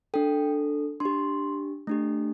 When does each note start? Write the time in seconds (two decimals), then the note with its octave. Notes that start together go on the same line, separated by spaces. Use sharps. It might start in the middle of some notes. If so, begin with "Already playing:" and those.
0.14 D4 A4 G5
1.00 D4 C6
1.05 G4
1.87 A3 D4 G4